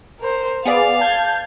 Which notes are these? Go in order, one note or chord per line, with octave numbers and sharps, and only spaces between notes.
A#4 C5
B3 G#4 D5 F5
A5 G6 G#6